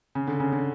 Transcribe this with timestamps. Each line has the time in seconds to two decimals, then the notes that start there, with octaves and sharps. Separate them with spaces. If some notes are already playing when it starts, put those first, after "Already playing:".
0.15 C#3
0.27 D3
0.40 C#3
0.52 D3